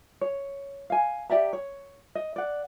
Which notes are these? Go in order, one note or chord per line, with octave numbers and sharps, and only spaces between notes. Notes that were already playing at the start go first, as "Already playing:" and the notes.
C#5
F5 G#5
G4 D5 E5 A#5
C#5
D#5
D5 F#5